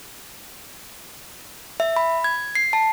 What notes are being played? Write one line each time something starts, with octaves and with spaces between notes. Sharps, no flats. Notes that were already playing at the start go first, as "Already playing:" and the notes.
E5
B5
G#6
C7
A5